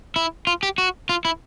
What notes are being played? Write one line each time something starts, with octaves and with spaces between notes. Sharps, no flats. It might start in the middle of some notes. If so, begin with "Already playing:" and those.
E4
F4
G4
F#4
F4
E4